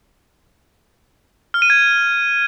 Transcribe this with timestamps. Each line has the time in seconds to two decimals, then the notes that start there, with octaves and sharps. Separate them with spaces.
1.54 F6
1.62 D#7
1.70 G#6